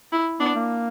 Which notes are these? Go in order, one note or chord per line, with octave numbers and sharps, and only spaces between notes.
E4
B3 D4
A#3